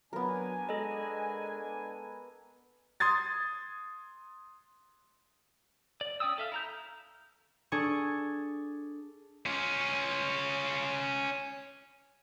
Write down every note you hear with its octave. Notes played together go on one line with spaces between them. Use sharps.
F#3 B3 D4 A#4 G#5
G#3 A4 D#5
C6 D#6 G#6 A6
D5
C#4 D5 G5 D#6 E6
A4 E5 F5
E4 A#5 G6
D4 G#4 A4 C#6
C#4 F4